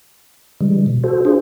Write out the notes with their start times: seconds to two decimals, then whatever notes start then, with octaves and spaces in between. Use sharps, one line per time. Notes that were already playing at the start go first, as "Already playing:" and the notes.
0.61 D3 E3 G3 G#3
0.86 B2
1.04 F#4 A4 C5
1.25 D4 F4 G#4 C5